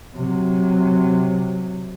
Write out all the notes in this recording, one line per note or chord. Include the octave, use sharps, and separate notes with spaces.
C3 F#3